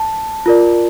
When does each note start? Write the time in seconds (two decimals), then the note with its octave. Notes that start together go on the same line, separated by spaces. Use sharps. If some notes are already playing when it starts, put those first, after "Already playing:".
Already playing: A5
0.46 F4 A#4 D5